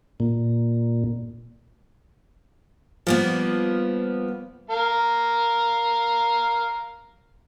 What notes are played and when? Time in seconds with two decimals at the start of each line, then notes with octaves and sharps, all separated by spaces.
0.20 A#2
3.07 F3 G3 A#3 B3
4.70 A#4 F5